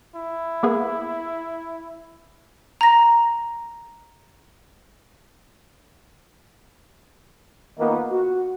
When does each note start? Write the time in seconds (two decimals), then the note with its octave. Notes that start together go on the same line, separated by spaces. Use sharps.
0.16 E4
0.63 A#3 B3 G#4
2.81 A#5 A#6
7.78 D#3 A#3 B3 D#4 F4
8.10 F#4